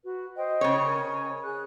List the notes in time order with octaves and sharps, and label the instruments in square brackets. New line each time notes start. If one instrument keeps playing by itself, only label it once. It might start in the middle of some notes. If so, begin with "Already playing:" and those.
[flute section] F#4 B4
C5 D#5 G5
[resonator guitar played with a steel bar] C#3 C#5
[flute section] A#4 G#5
G#4 F#6